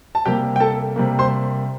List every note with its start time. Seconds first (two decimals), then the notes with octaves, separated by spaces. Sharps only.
0.15 A5
0.25 C3 G3 A#3 G4 G5
0.56 G5
0.60 A4 A5
0.96 C3 G3 A#3
1.19 C5 C6